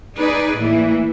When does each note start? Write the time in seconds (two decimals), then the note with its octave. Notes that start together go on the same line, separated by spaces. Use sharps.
0.16 D#4 G#4 B4 D5
0.57 A2 E3 A#3